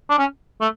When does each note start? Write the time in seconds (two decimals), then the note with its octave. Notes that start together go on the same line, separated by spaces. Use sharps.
0.10 D4
0.18 C#4
0.61 A3